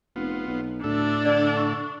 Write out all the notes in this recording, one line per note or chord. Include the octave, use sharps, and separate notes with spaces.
F1 B3 F4
B1
D2 A2 D4 A4
D3 D5
C#6